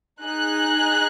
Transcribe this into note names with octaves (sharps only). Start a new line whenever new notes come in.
D#4 G#4 F#6